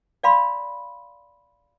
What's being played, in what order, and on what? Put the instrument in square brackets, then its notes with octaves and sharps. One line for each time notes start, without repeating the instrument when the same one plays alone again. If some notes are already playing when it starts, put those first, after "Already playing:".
[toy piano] D5 F5 B5 C6